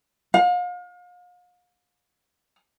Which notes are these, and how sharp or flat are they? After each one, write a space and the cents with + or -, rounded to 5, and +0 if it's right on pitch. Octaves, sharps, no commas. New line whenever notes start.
F5 +40